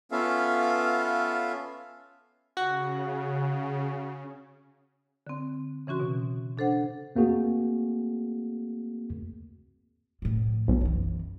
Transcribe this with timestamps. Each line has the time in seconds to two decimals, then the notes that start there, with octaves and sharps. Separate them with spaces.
0.11 B3 C#4 F4 A4 E5 F5
2.57 C#3 F#4
5.27 D3 C4
5.87 C#3 E3 C#4 F#4 C6
6.00 B2
6.58 D4 A4 C5 F#5
7.16 A3 A#3 C4 F#4 G#4
10.22 A2 F3
10.68 B1
10.81 F#2 E3